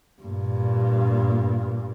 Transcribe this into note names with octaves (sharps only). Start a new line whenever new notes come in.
G2 A#2